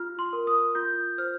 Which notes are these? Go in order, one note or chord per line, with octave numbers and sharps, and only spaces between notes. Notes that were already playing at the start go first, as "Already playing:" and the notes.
Already playing: F4 F6
C6
A#4
D#6
F4 G6
C5 F6